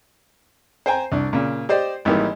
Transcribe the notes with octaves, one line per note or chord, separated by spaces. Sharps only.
C5 G5 G#5 A#5
C2 D4
A#2 C#3
G4 C5 D5 D#5
G#1 E3 G3 A#3 D#4